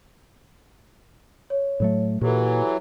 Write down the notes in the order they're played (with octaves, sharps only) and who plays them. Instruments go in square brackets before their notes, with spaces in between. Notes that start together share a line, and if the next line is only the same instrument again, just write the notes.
[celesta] C#5
[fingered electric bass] A2 F#3 A3
[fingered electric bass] A#2 [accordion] E3 F#3 [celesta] G4 A4